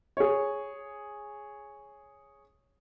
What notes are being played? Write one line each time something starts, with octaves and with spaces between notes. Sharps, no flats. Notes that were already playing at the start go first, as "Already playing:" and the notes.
G#4 C#5